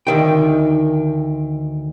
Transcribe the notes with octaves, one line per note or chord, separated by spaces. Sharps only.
D2 D#3 G5